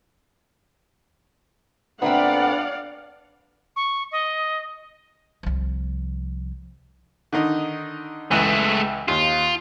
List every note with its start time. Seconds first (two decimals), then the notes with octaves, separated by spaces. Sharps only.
2.02 A#2 A3 B3 C4 D4 D5 F5 F#5
3.76 C#6
4.12 D#5
5.43 C2 F3
7.33 D3 D#3 D#4
8.31 C#2 E3 G#3 A3 F#6
9.08 D#2 F4